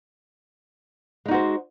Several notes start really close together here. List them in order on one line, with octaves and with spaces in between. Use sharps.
G#3 D#4 F#4 C5